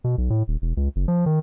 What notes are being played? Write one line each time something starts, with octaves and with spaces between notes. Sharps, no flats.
B2
B1
A2
D#1
E1
C#2
F#1
F3
D#3